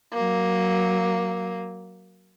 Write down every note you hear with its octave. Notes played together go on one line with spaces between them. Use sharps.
F#3 A#3